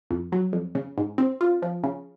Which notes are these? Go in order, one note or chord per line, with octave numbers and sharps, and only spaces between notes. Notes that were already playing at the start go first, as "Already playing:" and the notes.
F2
F#3
F2
C#3
G#2
C4
F4
F3
C#3